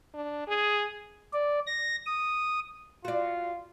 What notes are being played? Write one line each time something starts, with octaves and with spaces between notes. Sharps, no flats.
D4
G#4
D5
A#6
D#6
F4 F#4 D5